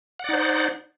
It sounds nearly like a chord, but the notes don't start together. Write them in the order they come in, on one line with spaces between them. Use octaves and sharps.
F#5 D5 D#4 C5